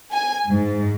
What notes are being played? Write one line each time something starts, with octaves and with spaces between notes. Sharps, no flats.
G#5
G#2